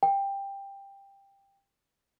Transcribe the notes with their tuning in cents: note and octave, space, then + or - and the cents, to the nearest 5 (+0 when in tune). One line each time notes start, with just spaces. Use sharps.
G5 +15